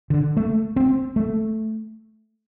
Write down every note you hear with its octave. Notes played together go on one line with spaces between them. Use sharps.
D3
A3
C4
A3